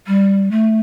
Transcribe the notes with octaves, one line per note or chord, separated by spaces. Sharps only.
G3
A3